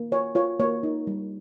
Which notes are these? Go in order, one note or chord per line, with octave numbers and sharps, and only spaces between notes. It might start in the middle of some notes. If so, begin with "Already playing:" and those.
Already playing: A#3
F4 C#5
F4 C#5
A#3 C#5
D#4
G3